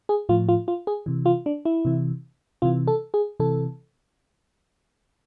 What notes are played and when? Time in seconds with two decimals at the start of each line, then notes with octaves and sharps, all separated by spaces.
0.09 G#4
0.29 A2 F3 F4
0.48 F4
0.68 F4
0.87 G#4
1.06 C3 E3
1.26 F4
1.46 D4
1.65 E4
1.85 C3 E3
2.62 C3 E3 F4
2.87 A4
3.14 G#4
3.40 C3 E3 A4